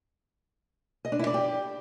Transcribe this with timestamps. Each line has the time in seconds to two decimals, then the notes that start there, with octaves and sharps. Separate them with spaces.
1.05 D#5
1.12 D4
1.19 E4
1.27 D5
1.34 G4